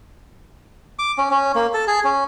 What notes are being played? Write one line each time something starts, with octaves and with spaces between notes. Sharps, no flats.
D6
C#4
C#4
A#3
A4
G#4
C#4